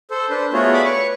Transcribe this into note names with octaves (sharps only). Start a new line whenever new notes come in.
A4 C5
D4 B4 C5
A3 B3 F4 F#4 G#4 C#5
D5 E5 B5 D6 D#6
B4 C#5 C#6